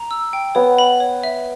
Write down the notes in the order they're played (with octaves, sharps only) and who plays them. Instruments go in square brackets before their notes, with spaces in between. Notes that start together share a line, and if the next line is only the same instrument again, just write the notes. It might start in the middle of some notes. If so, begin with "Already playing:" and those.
Already playing: [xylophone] A#5
E6
G5
[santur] B3 [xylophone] C#5
[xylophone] B5
C#5
E5